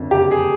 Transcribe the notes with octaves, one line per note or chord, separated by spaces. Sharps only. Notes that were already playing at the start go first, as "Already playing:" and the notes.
Already playing: F#1 F2 D3
G4
G#4